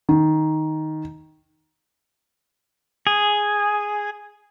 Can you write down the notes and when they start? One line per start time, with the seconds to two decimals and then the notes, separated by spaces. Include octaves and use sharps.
0.09 D#3
3.07 G#4